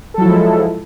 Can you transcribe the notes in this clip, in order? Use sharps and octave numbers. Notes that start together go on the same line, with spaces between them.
F3 F#3 G#3 E4 A4